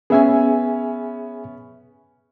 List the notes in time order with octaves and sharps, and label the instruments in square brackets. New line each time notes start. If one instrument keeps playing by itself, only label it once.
[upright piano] B3 C#4 [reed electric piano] G#4 E5 G#5